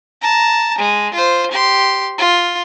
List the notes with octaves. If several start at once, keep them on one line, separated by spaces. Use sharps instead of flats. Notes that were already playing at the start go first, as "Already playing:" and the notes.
A5 A#5
G#3
F4 C5
G4 C6
F4